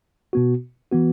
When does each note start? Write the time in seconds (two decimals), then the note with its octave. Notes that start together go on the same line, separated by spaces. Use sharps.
0.33 B2 B3 F#4
0.91 E3 B3 F#4